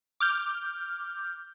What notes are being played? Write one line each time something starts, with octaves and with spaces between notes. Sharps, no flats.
D6 F6 G6